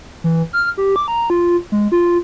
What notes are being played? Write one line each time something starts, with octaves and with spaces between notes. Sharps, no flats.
E3
F6
G4
D6
A#5
F4
G#3
F4